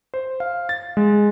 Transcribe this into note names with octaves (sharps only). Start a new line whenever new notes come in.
C5
F5
A6
G#3